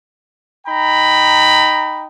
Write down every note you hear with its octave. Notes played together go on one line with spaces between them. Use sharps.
D#4 G5 A#5 B5